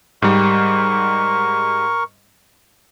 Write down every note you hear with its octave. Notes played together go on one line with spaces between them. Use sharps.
G#2 G3 A#4 C#6